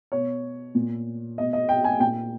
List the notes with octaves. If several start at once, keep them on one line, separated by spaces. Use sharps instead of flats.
B2 C#5
A#2
B2 D#5
D#5
G5
G#5
A#2 G5